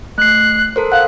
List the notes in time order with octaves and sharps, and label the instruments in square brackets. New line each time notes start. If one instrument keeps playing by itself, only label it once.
[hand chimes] A3 C7 [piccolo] F#6
[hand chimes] A4 A#4 C5
[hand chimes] F5 F#5 [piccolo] F#6